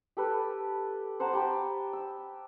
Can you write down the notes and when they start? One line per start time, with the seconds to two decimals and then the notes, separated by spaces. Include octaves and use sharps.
0.17 G4 A4 B4
1.20 C5 F#5 A5 A#5
1.33 G4 G5 B5
1.93 E6